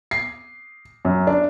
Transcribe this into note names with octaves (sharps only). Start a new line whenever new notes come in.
C7
F#2
D4